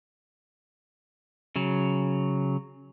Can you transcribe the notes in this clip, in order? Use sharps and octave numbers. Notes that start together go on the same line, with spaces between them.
C#3 F#3